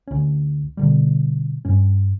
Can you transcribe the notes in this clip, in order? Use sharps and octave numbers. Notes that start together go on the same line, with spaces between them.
D2 C#4
B2 D3 G3
G2 C#4